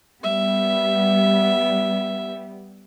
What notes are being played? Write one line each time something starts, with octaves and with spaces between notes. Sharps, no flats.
G3 B3 E5